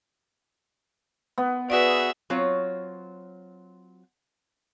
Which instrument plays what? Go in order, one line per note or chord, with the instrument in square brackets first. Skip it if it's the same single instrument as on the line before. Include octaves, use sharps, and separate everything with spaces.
[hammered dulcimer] B3
[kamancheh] F#4 [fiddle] G#4 E5 [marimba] B4 D5
[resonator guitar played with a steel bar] F#3 C4 F4 C#5